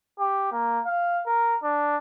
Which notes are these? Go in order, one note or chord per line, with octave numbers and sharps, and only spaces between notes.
G4
A#3
F5
A#4
D4